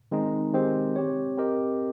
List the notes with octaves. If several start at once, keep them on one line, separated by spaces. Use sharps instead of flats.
D#3 G#3 C4 D#4
D#3 G#3 C4 G4 C5
C4 G4 C#5
C4 G4 A#4 D#5